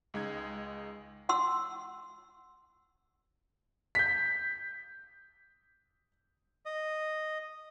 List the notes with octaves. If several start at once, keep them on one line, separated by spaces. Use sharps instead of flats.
C#2 G#3 D#4 G#6
F#5 C6 E6
G6 B6
D#5